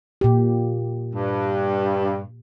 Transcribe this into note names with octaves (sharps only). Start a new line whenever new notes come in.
A#2 G4
G2